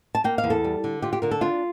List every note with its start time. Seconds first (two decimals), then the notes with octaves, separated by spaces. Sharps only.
0.15 A5
0.24 A#3 G5
0.38 F5
0.44 E2
0.50 A4
0.64 G3
0.84 D3
1.02 F4 G4
1.13 G4
1.22 D3 A#4
1.31 A4
1.41 D4 F4